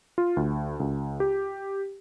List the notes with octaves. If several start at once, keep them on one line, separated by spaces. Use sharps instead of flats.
F4
D2
C#2
G4